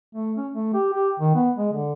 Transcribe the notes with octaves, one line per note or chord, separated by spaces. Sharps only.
A3
C#4
A3
G4
G4
D#3
B3
G#3
D3